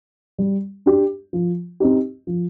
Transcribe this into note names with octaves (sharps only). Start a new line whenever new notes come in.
G3
D4 G4
F3
C4 D#4 G4
F3